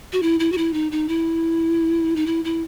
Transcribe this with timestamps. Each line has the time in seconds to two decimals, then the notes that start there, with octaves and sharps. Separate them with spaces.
0.13 F#4
0.22 E4
0.40 E4
0.52 F#4
0.58 E4
0.73 D#4
0.92 D#4
1.08 E4
2.16 D#4
2.26 E4
2.45 E4